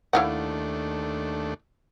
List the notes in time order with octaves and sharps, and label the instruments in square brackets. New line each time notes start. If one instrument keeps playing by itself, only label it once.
[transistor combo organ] D#2 A3 D4 [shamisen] E4 F5 F#5